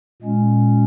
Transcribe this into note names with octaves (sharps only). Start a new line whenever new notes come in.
A#2 G#3 C#4